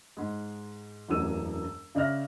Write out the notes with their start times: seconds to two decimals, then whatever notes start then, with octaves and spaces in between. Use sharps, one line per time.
0.17 G#2 G#3
1.09 E1 A1 F#2 E3 E6 D#7
1.95 C#3 D5 E5 F6 A#6